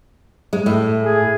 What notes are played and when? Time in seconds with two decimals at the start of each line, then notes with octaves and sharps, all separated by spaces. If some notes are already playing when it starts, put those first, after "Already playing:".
0.53 G#3
0.66 A2
1.01 G#4